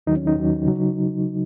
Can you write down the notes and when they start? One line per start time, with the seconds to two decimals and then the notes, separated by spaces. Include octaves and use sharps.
0.07 D#2 D#3 F#3 D#4
0.16 C#4
0.27 D#4
0.36 D#2 D#3 F#3
0.67 C#3 F#3